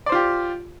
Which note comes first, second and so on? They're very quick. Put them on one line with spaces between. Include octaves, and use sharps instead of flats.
D5 C5 F4 G4